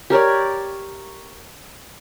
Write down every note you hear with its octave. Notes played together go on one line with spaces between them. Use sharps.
G4 A#4 C#5 D5